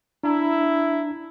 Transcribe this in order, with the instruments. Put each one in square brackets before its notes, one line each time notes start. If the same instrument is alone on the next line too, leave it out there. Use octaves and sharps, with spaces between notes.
[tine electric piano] D4 A#5 [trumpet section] E4